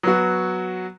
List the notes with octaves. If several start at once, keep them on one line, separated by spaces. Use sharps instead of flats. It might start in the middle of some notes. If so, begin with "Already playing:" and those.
F#3 B3 F#4